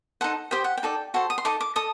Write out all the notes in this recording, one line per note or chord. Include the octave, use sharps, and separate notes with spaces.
D#4 A4 C5 F#5
G4 C5 D#5 G5
F#5
G5
D#4 A4 D5
F#4 A4 C5
D#6
C6
D#4 A4 D#5 D6
D6
A4 D#5 D#6